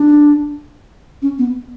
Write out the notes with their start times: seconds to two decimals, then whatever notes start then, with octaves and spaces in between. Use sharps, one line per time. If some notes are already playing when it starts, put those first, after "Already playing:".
Already playing: D4
1.22 C#4
1.38 B3